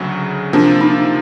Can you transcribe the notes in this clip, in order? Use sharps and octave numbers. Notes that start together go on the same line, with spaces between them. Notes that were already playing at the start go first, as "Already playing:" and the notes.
Already playing: D2 C#3 F#3
C3 F3 A#3 D4
D#4